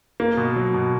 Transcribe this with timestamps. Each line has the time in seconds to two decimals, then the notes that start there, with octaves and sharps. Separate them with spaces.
0.20 A#3
0.37 B2
0.56 F#3
0.74 B2